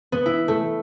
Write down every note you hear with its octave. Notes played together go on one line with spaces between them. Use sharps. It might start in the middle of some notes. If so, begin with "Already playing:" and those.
B3
E4
A3